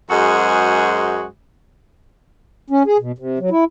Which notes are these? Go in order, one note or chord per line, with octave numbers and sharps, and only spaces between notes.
F#2 G#3 F#4 G#4 C5
C#4
G#4
B2
C3
F#3
E4